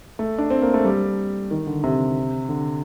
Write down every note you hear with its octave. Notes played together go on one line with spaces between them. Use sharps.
A3
D4
C4
A#3
A3
G3
D#3
D3
C3
D3